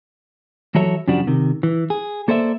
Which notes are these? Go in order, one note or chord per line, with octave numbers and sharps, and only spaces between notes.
E3 F#3 F#4 A4 C#5 E5
F#2 C#3 F3 G3 D4 F#4
C3 D#3
E3
G#4
A#3 A4 C5 D5 E5